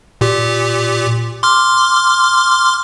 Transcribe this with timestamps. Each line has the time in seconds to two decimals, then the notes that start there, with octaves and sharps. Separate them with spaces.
0.21 A#2 G4
1.43 C6 D6 F6